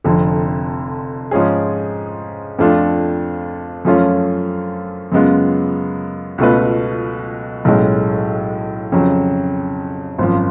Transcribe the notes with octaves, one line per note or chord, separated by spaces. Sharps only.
F1 F2 D3
G#2 F3 G#3 C#4 G#4
F2 F3 A3 D4 F4
F#2 F3 A3 C#4 F4
F#2 C#3 G#3 B3 F4
C#2 B2 A3 F4 B4
B1 A2 G#3 C#4
F2 C#3 F#3
G#1 F#2 F3